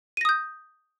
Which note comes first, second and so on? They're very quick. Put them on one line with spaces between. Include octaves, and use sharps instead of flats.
D#7 A#6 D#6 G6